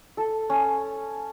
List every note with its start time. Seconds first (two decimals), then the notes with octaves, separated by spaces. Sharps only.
0.17 A4
0.50 C#4